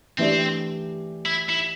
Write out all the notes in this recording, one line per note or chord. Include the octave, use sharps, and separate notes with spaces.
E3 A3 C4 D4 G4 D5
E4
E4